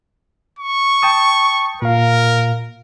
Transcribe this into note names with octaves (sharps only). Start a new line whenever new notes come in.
C#6
G5 A5 D#6
A#2 A#4 F5